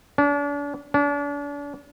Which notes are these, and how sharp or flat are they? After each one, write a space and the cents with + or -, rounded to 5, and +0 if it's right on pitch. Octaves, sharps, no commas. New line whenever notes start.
D4 -40
D4 -40